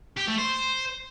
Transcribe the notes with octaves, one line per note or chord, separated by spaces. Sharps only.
G4
A3
C5